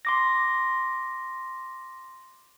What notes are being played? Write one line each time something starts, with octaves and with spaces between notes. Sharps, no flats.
C6 D6 A#6